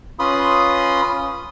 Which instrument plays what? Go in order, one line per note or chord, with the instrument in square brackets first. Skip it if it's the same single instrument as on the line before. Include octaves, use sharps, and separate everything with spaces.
[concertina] C#4 F4 B4 B5 C6 D#6